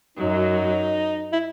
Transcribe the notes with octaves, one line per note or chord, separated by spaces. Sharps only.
F#2 F#3 D#4
E4